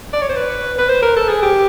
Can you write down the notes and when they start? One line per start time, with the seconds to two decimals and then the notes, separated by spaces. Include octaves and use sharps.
0.13 D5
0.21 C#5
0.29 C5
0.36 B4
0.78 B4
0.89 C5
1.02 A#4
1.16 A4
1.29 G#4
1.42 G4